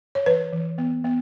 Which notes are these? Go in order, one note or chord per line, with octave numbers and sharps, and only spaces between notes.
C#5
E3 B4
E3
B3
B3